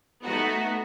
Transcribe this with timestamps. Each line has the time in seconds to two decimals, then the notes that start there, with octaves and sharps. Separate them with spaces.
0.24 A3 B3 D#4 F#4